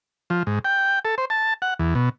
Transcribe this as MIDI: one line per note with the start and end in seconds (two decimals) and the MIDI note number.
0.30 0.43 53
0.47 0.59 44
0.65 0.99 79
1.05 1.15 69
1.18 1.25 72
1.30 1.54 81
1.62 1.74 78
1.79 1.94 40
1.95 2.09 47